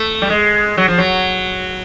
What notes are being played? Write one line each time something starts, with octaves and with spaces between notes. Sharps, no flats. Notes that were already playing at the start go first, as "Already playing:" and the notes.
Already playing: A3
G3
G#3
F#3
F3
F#3